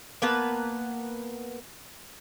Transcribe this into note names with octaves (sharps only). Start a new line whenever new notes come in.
A#3 B3 B4 A5